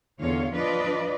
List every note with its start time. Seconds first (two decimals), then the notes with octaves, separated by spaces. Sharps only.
0.20 E2 D3 F4 C#5 F5
0.54 F3 D4 F4 B4 D5 D#5